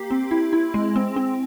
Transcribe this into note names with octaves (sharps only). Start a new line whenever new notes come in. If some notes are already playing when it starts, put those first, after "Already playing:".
Already playing: A#3 G4
C4
E4
E4
G#3
C4
C4